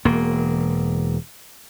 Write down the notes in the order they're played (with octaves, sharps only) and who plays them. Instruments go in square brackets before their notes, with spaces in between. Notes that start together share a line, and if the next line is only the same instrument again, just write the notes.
[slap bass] E1 A#3